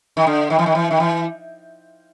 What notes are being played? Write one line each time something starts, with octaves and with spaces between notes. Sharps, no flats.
D#3
D3
D#3
E3
D#3
E3
D#3
E3